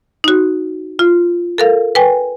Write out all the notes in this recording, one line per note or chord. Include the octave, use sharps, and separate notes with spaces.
D#4 F#4
F4
A4 A#4 F5
B4 G5 G#5